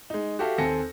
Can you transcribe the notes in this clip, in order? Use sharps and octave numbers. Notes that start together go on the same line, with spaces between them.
G#3 D#4
F#4 G4 A4 E5 F5
D#2 C4 A4 G#5 A#6 C#7